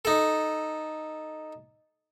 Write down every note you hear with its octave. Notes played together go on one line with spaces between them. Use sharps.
D#4 A4